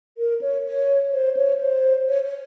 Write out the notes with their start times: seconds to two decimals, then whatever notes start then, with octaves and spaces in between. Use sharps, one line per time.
0.18 A#4
0.41 C#5
0.66 C#5
1.13 C5
1.37 C#5
1.61 C5
2.08 C#5
2.24 C#5